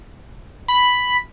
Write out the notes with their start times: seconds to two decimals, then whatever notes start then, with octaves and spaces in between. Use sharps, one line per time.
0.68 B5